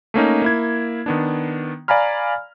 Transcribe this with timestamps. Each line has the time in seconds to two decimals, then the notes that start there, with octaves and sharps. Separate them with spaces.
0.14 A3 A#3 C#4 D#4
0.42 A#3 E4 G#6
1.06 D#3 B3 D4
1.88 D5 F5 G#5 A#5 B5 F6